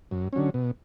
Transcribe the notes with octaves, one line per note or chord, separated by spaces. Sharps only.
F#2
D3 F#3 C#4
B2